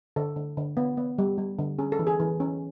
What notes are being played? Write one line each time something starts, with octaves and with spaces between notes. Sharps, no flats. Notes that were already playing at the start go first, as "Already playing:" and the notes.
D3 A4
D3
D3
B3
B3
G3
G3
D3
C#4 G#4
A4
E3
G#4
E3
C#4